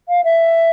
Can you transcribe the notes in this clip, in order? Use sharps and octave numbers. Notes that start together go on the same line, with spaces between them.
F5
E5